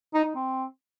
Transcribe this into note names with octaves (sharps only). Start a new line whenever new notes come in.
D#4
D#4
C4